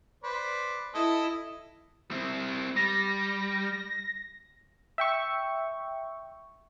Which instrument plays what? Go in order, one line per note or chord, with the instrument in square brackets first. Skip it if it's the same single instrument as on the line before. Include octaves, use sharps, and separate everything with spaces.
[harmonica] B4 C5 D5
[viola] E4 [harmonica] A4 D#5
[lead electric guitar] C4 E4
[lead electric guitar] G3 [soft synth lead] A#6
[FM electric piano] E5 G5 C#6